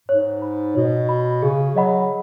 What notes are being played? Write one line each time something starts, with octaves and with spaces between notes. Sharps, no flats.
G#2 C#5
B5
B2 C#5
B5
C#3 G#4
F#3 D#5 F#5 B5